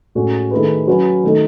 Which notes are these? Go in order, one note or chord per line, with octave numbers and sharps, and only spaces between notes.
A2 G#3 C#4 F#4
D#3 A3 E4 G#4 B4
F#3 C#4 F#4 B4
D#3 A3 D#4